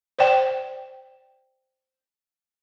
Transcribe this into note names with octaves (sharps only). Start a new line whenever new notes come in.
C5 D5 G5